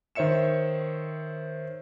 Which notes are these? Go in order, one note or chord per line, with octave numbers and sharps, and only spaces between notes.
D#3 C5 C#5 E5 C#7 E7